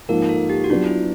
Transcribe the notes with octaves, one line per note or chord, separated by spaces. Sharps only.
G#2 F3 A#3 A#4
A4
G4
F#4
F#3 B3 D4 F4
E4